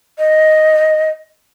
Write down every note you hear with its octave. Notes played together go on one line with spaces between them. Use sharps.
D#5